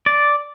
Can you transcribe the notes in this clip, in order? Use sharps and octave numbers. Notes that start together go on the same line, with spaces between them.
D5